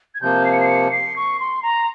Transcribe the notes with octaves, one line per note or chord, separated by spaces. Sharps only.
G#6
C3 F3 A#3 G6
C7
C#7
C7
C#7
C7
C#6
C6
A#5